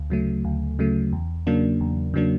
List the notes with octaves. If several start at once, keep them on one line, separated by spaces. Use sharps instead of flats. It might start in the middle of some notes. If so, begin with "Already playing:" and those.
Already playing: D2
C#3 F#3 A3
D2
C#3 F#3 A3
E2
C#3 F#3 A#3 D4
E2
C#3 F#3 A#3 D4